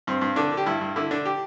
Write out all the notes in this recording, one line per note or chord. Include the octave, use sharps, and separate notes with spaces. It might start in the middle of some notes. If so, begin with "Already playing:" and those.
G2 C4
G2
D3 D4
D3
G4
G2 E4
G2
D3 E4
D3 D4
G4